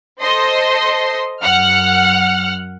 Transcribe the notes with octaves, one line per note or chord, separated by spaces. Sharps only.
A4 C5 D#5 C6
F#2 F#5 F6